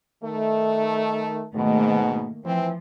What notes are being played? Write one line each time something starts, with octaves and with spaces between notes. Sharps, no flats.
D#3 A3
G#2 B2 D#3 A3 A#3
E3 F3 C4